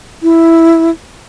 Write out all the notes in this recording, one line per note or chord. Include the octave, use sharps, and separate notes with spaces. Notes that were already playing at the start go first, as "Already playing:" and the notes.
E4